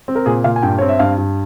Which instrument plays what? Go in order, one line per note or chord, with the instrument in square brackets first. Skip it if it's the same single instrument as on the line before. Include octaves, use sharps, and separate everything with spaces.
[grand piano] C4
A#4
A#2 G#4
A#2 F5
G#5
G2 G5
C4 C#5
E5
G2 F5
G2